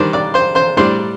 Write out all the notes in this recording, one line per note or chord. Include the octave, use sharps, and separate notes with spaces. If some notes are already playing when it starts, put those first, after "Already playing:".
Already playing: D#3 G3 D4 C5 C6
D5 D6
C5 C6
C5 C6
A2 G3 D4 C5 C6